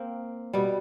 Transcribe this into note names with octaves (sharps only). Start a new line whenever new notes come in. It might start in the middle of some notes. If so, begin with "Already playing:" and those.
Already playing: A#3 C4
B2 G3